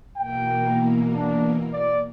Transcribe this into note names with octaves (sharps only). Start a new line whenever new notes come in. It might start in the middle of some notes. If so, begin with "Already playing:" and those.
B2 E3 A#3 G5
D4
D5